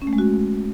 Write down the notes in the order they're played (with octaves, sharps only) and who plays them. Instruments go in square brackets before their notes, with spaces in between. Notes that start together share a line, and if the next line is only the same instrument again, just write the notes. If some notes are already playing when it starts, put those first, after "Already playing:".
[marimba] C#4
A3
G#3
F#4